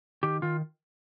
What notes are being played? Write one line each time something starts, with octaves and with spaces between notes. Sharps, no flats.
D#3 G4
D#3 F4